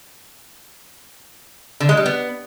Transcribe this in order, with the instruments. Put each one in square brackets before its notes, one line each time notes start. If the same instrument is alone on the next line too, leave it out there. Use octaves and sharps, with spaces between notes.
[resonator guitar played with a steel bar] D3
G#3
G3
B3